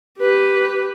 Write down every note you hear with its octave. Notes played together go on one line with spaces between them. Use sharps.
G4 B4